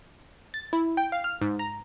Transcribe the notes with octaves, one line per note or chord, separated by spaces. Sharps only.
A6
E4
G5
F5
F6
G#2
A#5